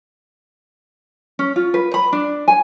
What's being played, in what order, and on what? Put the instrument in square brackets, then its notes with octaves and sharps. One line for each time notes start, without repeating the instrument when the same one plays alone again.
[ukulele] C#4
F4
B4
B5
D4
G#5